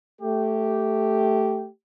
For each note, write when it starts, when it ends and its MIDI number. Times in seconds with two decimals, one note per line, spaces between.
0.21 1.69 57
0.21 1.69 67